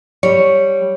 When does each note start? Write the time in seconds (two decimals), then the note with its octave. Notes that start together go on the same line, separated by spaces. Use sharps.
0.23 G3 C#5